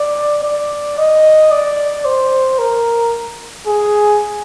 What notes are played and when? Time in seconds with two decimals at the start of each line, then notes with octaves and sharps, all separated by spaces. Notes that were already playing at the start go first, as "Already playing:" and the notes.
Already playing: D5
0.43 D5
0.98 D#5
1.52 D5
2.05 C5
2.59 A#4
3.67 G#4